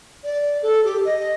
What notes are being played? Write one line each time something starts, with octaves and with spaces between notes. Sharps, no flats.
D5
A4
G4
D#5